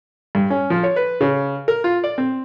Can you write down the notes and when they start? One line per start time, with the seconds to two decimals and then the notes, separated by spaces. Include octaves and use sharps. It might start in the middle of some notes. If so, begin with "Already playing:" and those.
0.35 G2
0.50 C#4
0.70 F3
0.83 C#5
0.96 B4
1.21 C#3
1.68 A#4
1.84 F4
2.04 D5
2.18 C4